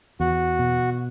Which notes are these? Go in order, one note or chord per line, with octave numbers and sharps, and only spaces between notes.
E2 F#4
B2